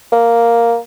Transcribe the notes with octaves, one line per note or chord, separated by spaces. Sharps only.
A#3